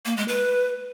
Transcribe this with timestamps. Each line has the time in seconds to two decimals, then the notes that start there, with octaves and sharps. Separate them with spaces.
0.05 A#3
0.17 G#3
0.28 B4